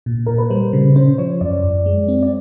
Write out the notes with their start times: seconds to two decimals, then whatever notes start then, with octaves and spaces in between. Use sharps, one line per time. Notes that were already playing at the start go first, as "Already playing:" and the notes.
0.06 A#2
0.26 A#2 A#4
0.38 B4
0.50 G3 C5
0.73 C#3
0.96 C#4 C5
1.18 F3 C#5
1.41 F#2 D5
1.64 F#2
1.86 G#3
2.08 C4
2.23 D5